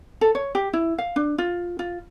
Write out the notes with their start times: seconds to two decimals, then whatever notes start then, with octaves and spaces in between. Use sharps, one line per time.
0.21 A4
0.35 C#5
0.55 G4
0.73 E4
0.98 F5
1.16 D4
1.38 F4
1.79 F4